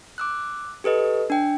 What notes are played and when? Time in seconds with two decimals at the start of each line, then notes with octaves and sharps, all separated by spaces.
0.18 D6 E6 F#6
0.84 G4 A4 B4 D#5
1.30 D4 G5